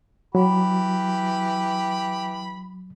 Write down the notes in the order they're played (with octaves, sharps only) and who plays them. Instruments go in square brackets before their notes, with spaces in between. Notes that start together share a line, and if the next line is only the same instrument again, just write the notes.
[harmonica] E3 G4 B5 [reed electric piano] F#3